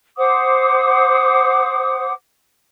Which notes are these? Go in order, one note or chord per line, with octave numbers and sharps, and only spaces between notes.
C5 F#5 D6 D#6